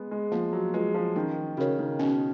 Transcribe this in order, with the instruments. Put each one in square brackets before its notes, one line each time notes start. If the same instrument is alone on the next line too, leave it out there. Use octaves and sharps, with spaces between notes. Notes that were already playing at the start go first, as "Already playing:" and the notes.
Already playing: [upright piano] G#3 B3
G#3
[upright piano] F3 [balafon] A#3
[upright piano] F#3
[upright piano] G#3 [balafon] F4 B4
[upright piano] F3
[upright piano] D#3 [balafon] C#4
[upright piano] C#3 [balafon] F#4 A#4 C#5
[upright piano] D#3
[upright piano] B2 [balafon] C#4